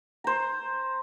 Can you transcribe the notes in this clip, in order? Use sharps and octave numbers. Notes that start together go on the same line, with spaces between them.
C5 A#5